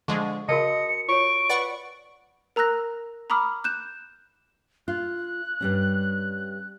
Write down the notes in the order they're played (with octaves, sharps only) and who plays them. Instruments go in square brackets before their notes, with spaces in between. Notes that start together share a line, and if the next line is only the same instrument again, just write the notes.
[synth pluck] D3 F3 G#3 [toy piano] C#6
[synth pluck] C#3 [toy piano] F#4 A#4 A5 [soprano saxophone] D#5 [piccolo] C#7
[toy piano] F4 C#5 [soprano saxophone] C#6 [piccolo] D7
[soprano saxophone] B4 [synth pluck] D5 F#5 C#6
[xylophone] A#4 A#5 E6 F#6 A#6
A#5 B5 D6 D#6 F6
F#6 G6 E7
[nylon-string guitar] F4 [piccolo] F#6
[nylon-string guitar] G2 G3 C#4